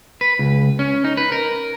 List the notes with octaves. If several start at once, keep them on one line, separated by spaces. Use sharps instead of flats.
B4
C#2
C#4
D#4
B4
A#4